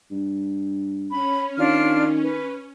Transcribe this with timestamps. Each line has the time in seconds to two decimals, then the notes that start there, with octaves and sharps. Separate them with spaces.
0.11 G2
1.10 C#4 B5
1.58 D#3 D4 F4 F6
2.22 B4